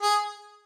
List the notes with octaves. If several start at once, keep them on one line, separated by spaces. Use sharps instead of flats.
G#4